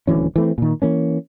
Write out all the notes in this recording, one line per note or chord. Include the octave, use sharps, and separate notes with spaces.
D#1 D2 E3 C#4
E3 A3 C4
A#2 D#3
E3 A#3 C#4